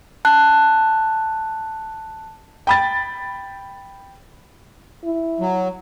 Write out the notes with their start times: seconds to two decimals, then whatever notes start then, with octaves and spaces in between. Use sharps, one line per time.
0.25 A5 F#6
2.67 G5 B5 A6
5.04 E4
5.40 F#3